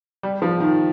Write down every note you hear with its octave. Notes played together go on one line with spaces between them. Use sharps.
G3
F3
D#3